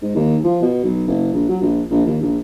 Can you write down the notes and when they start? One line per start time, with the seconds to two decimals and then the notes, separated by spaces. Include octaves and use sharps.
0.02 G#2
0.16 D#2
0.44 F3
0.62 B2
0.84 B1
1.08 F#1
1.33 A#1
1.48 F#3
1.62 A#1
1.91 A#1
2.06 D#2
2.22 A#1